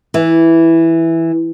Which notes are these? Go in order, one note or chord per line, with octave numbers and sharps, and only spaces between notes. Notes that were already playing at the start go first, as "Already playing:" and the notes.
E3